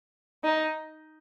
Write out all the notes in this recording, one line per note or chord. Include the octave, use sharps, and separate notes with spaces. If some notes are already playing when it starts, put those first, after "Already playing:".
D#4